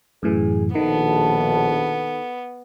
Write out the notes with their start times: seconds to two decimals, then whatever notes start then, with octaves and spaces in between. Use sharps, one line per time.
0.23 F#2 A2 E3 G#4
0.75 A#1 B2 D#3 B3 A4 A5